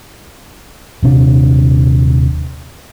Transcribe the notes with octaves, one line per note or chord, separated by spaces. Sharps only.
D#1 C3 D4